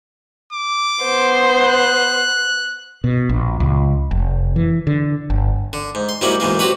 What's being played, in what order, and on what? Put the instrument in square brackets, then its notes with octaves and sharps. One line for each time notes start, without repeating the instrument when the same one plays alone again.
[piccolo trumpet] D6
[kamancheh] B3 C5
[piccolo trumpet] F#6
[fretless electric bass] B2
A#1
C#2
F1
E3
D3
G1
[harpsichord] D3
G#2
C6
G#2 F#3 G3 A#3 C#4 E4
B1 G#2 E3 A#3
C4 F#4 G4 B4 C#5